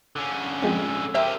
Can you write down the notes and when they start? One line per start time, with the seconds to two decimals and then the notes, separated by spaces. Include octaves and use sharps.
0.16 D3 C#4
0.62 F3 G#3 C4
1.15 G4 A#4 C5 E5 G5